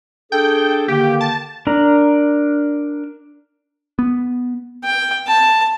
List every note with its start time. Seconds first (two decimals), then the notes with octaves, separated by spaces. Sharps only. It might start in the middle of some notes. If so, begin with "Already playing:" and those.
0.32 D4 G#4 A4 G5
0.88 D3 D#3 A#3 G4
1.21 A5
1.67 D4 A#4 A#5
3.99 B3
4.84 G5
5.27 A5